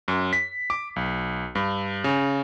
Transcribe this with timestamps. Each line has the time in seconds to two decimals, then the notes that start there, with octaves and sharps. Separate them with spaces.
0.08 F#2
0.33 B6
0.70 D6
0.96 B1
1.55 G2
2.04 C#3